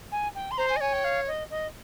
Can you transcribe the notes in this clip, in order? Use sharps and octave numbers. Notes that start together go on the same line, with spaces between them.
G#5
G5
C6
C5 A#5
G#5
D#5
C#5 G#5
G5
F5
D#5
D#5